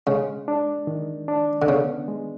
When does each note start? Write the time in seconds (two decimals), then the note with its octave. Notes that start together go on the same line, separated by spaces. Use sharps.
0.07 C#3 G#3
0.48 D4
0.87 D#3
1.28 D4
1.62 D3
1.68 C#3 B3
2.08 G#3